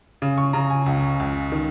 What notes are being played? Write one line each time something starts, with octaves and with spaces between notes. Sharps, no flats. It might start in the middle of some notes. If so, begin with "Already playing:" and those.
C#3
C#6
C#3 A#5
G#5
C#2
C#2
D#3